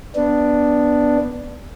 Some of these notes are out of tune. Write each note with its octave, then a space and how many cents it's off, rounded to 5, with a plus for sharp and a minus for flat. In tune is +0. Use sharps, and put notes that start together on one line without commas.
B3 +0 D4 +0